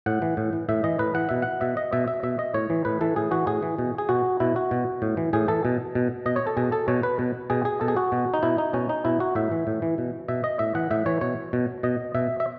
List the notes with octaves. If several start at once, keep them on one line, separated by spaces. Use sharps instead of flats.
A2 F#5
E3
A2
E3
A2 E5
E3 D#5
A2 B4
E3 F#5
B2 E5
F#5
B2 E5
D#5
B2 E5
E5
B2 E5
D#5
A2 C#5
E3
A2 B4
E3 A4
A2 G#4
E3 F#4
A2 G#4
E3
B2
G#4
B2 F#4
B2 E4
F#4
B2
A2
E3
A2 G#4
E3 A4
B2
B2
B2 D#5
C#5
A4
B2 G#4
A4
B2 C#5
B4
B2
B2 G#4
G#4
B2 A4
G#4
F#4
B2
D#4
B2 E4
D#4
B2 C#4
D#4
B2 E4
F#4
A2 E5
E3
A2
E3
B2
B2 E5
D#5
A2 E5
E3 F#5
A2 E5
E3 C#5
B2 C#5
B2
B2 D#5
B2 E5
E5